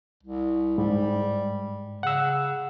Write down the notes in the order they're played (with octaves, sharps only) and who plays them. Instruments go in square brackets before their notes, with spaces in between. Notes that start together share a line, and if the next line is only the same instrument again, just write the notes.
[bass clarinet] C2
[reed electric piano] G#2 [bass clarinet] G3
[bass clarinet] C#3 [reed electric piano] F#5 E6